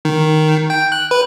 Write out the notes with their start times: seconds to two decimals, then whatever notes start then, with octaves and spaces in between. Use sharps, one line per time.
0.05 D#3
0.70 G5
0.92 F#6
1.11 B4